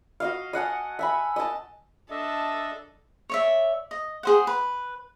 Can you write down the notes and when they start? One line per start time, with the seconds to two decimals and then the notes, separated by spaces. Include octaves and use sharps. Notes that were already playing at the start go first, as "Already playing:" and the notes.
0.20 F#4 D#5 F5
0.53 D#5 F#5 G#5 A5
0.99 E5 G#5 B5
1.36 D#5 A5
2.10 D4 A4 D#5 E5
3.30 C#5 D5 E5
3.91 D#5
4.23 G#4 C5 F#5
4.47 B4